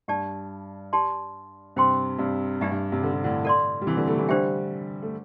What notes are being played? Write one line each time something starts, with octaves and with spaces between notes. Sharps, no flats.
G2 G4 D5 A5
G4 D5 A5 C6
G2 C3 C5 G5 C6
G2 C3
G2 D4 G4 E5
G2
G2 C3
D3
C3
A2 D3
A4 D5 C6
G3
C3 E3
D3 G3
E3 A3
C3 E3
D3 G3 D4 G4 C5 E5 G5
A3